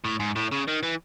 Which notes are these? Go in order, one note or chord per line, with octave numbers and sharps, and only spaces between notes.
A2
G#2
A2
C#3
D#3
E3